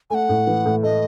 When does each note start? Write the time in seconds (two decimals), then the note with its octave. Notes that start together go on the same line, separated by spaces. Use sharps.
0.10 A3 F#5 G#5
0.29 A2
0.47 E3
0.66 A2
0.83 A3 D#5